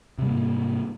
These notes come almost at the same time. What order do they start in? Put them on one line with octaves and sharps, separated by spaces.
C3 G3 A#3 G#2